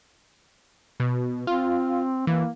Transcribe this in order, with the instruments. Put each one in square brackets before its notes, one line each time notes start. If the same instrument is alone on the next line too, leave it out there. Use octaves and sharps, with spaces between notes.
[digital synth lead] B2
[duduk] C4 [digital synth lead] F4
[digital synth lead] E3 [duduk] A#3